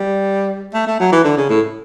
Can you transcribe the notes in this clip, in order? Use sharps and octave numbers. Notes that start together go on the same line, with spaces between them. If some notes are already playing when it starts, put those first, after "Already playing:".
Already playing: G3
A3
A3
F#3
E3
D3
C#3
A2